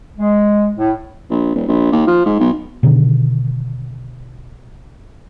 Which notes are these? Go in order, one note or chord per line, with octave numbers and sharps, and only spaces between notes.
G#3
A2
A#1
D#1
A#1
D#2
F3
G#2
B1
B2 D3 D#3